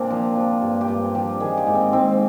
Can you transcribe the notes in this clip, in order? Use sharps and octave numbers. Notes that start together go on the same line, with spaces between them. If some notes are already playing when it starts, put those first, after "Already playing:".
Already playing: A#2 A#3 C4 D4
F3
F3
G2
G4
G2 F4
F3 G4
D#3 G#4
G4
G#2
C4
G#2 C4